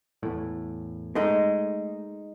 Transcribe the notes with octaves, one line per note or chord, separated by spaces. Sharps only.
E2 A2
G#3 A3 D#4